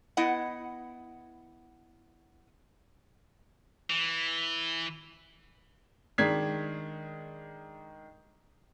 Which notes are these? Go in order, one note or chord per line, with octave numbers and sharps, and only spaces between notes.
B3 E4 D#5 F#5
E3
D#3 G#3 D4 G#6 B6 C7